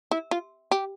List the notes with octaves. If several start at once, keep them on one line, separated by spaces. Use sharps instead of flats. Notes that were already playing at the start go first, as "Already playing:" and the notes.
E4
F4
G4